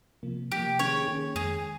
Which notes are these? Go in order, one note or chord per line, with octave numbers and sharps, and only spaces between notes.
C3 F3 A#3
C3 F3 A#3 G4
D#3 A#3 C#4 G#4 C#5
D#3 A#3 C#4 G#4
F2 D#3 G#3 G#4